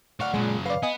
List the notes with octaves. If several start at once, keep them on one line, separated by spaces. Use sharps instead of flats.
A2 D5 F5 F#5 C#6
F#2 A#2 C#3 G#3
B4 D5 F5
B3 D#5 G#5